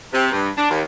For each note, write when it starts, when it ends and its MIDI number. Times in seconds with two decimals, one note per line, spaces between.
0.13 0.31 48
0.32 0.49 43
0.57 0.69 62
0.70 0.81 39